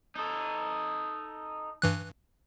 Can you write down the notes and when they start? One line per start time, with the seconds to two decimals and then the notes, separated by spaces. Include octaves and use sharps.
0.16 D#4 A4
1.82 G2 E3 F#6